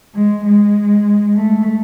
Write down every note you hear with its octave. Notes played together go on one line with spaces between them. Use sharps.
G#3
G#3
A3